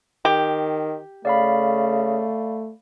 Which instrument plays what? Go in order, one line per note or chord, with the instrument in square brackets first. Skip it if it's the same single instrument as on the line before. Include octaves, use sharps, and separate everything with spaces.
[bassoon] D#3 [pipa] G4
[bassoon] C#3 [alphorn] A3 [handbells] D5 F5 B5